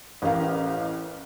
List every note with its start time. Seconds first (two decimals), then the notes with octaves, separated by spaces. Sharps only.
0.22 A1 C#4 G4 A#4 F5 A#5